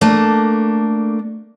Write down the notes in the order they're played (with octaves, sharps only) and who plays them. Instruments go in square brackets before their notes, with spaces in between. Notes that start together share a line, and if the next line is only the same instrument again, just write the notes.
[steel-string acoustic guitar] A3 A#3 D4